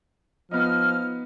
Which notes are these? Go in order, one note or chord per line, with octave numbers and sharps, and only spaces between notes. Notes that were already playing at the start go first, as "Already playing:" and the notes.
F3 B3 D#4 F6